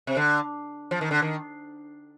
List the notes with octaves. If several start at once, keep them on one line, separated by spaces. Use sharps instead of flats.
C3
D3
F3
D#3
D3
D#3